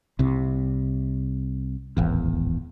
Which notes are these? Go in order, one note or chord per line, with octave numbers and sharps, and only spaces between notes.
C2 C3
D1 G#1 E2